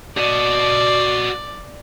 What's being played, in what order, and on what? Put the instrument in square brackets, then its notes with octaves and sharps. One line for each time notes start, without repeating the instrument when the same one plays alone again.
[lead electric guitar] F#4 D#5 [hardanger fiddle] D5